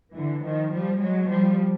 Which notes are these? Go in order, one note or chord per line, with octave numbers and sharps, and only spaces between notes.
D3 E3
D#3 F3
F3 G3
F#3 G#3
F3 G3